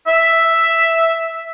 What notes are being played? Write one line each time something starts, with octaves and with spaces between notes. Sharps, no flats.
E5